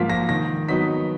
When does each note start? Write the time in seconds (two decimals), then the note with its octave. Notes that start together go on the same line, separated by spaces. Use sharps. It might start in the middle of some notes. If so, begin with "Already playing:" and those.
Already playing: G#2 F3 A#3 F4 B6
0.10 A#6
0.29 D#3 A#6
0.69 F#3 B3 D#4 B6